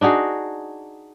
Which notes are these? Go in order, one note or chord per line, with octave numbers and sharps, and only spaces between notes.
D4 D#4 F#4 G#4